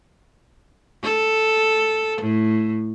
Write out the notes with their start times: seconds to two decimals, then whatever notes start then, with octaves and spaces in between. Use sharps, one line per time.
1.04 A4
2.21 A2